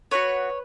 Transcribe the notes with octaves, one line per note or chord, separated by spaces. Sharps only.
B3 D4 F#4 B4 C#5